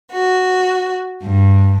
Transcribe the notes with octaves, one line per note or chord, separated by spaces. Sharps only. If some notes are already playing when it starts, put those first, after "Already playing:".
F#4
G2